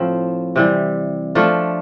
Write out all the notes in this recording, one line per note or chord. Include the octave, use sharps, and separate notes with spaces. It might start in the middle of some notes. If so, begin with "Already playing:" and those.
Already playing: A2 F3 C4
C3 E3 G3
F3 A3 D4 F4